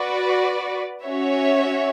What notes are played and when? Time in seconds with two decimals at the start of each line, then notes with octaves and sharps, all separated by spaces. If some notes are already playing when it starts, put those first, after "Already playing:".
Already playing: F#4 B4 D5
1.04 C#4 F#4 C#5 E5